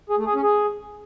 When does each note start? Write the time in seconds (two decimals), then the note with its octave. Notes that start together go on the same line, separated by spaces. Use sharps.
0.10 G#4
0.18 A3
0.26 G#4
0.35 C#4
0.43 G#4